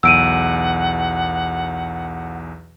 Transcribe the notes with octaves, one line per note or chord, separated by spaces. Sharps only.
B1 E2 F#5 E6 D7 D#7